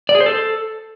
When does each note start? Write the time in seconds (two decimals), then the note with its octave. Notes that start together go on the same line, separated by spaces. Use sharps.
0.09 D5
0.15 G#4
0.20 C5
0.26 A4